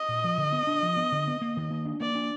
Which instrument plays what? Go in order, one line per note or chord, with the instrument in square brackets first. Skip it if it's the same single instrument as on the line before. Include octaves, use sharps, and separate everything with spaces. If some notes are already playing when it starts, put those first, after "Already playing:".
Already playing: [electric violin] D#5
[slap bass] A#2
F3
D3
B3
D4
F3
B3
D3
B3
A#3
D#3
A#3
D4
[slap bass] A#3 [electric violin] D5
[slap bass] D4